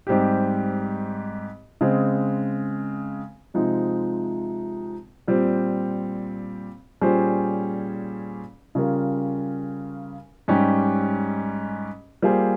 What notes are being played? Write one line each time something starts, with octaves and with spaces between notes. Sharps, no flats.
G#2 G3 C4 G4
C#3 G#3 C4
C3 F3 G#3 C4 D#4
A#2 G3 C4
A#2 G3 C#4 G#4 C5
C#3 G3 C#4 F4 A#4
G#2 G3 C#4 G4
G3 A#3 F4 G#4 C5